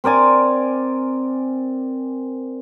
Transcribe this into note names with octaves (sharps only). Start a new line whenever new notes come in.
C4 A#4 D5 G#5